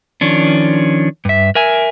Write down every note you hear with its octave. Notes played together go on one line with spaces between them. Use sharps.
D#3 F3 C#4 D4
G2 E5
A#4 E5 G#5